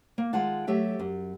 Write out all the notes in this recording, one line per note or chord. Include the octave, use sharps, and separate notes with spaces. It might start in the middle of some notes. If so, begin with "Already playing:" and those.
A#3
D#3 G#3 F4 F#5 A5
F#3 A3 G4 E5
F#2